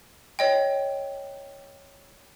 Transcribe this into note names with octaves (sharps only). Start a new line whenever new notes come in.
C#5 D#5 G5